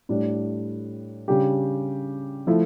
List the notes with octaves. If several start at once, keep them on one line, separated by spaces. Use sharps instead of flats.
A2 G3 D4
C#3 G3 D4 G4
F3 A3 E4